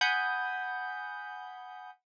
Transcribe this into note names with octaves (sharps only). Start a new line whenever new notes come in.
F#5 G#5 B5 D#6 G6